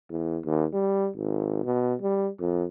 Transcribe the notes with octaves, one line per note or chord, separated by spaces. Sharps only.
E2
D#2
G3
G#1
B2
G3
F2